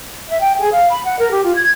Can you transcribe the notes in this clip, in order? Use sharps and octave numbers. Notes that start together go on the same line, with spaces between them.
E5
G5
G#4
F5
B5
F#5
A#4
G4
F4
G#6